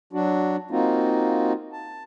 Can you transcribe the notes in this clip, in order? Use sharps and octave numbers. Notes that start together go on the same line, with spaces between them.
F#3 D4 F#4
A#3 C4 D#4 F4 F#4
A5